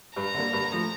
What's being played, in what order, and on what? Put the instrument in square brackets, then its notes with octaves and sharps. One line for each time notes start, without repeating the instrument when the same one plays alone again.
[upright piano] G2 [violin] A#5
[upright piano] D3 G3 A#3
G2
F3 A3